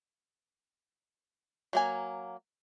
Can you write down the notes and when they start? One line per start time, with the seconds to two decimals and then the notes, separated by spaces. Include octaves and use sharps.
1.73 F#3 A#3 G#5